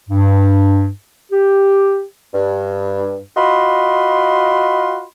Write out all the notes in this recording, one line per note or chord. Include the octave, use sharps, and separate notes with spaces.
G2
G4
G2
F4 F#4 D#5 B5 C6